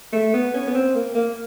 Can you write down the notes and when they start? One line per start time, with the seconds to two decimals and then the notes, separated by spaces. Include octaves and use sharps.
0.13 A3
0.34 B3
0.54 C#4
0.67 B3
0.75 C4
0.95 A#3
1.15 A#3